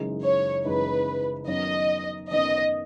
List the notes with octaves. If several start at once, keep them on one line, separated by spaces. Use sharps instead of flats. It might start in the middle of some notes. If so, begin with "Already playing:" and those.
Already playing: F#1 F#2 E3 G#3 D#4
C#5
F#1 F#2 E3 G#3 D#4 B4
F#2 D#3 F#3 B3 D#5
F#2 D#3 F#3 B3 D#5